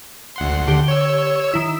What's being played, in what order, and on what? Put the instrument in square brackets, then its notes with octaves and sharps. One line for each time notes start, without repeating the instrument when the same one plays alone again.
[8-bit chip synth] D2 F#5 C6
[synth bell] D3 G4 G7
[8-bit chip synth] C#5 E6
[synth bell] D#3 E4 E6